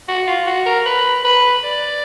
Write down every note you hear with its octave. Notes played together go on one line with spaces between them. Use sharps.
F#4
F4
F#4
A#4
B4
B4
D5